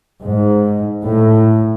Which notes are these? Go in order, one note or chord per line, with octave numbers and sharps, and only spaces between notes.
G#2
A2